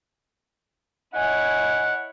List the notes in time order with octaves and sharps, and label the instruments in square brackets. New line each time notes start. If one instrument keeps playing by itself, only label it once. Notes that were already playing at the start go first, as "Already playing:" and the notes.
[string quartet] E4 C#5 [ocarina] D#5 [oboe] F#5 [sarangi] G#5